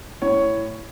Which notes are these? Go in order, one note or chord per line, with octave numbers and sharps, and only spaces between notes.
A2 C#5